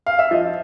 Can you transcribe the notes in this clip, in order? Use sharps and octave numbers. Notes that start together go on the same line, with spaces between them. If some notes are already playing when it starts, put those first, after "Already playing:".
F5
E5
F3 D#5